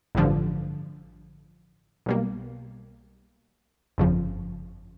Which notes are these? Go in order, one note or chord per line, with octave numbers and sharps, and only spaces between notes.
A1 G2 D3 F3
B1 B2 G3 A#3
G1 F2 C#3 F3